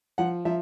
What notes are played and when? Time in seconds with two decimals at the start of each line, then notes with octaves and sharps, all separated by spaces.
0.18 F3 F#5
0.45 F3 E5